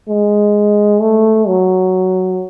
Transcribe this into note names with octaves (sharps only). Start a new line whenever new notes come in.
G#3
A3
F#3